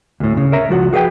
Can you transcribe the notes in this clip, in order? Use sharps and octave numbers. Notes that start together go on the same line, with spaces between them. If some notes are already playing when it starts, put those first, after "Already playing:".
D2 A2
C#3
A#4 C#5 E5 A#5
C#2 F3 F#4 F#5
F#4 G#4 B4 E5 G5